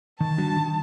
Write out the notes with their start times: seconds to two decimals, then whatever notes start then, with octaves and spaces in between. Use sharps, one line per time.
0.20 D#3 A5
0.38 G3 D4 F#4
0.56 D#3